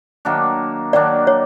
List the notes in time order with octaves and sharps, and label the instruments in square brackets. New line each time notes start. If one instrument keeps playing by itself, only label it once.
[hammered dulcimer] D#3 F#3 A#3 D4
[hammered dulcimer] D#3 F#3 A#3 D4 [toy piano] D5
[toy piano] C#5